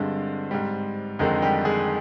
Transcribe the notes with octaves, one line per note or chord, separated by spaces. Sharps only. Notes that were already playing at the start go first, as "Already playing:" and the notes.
Already playing: G2 D3 G#3 C4
G#2 G3
F2 D3 D#3 G#3 D#4
G3 G4
G#3 G#4